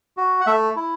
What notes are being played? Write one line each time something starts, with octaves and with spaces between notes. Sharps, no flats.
F#4
F#5
A3 E5
E4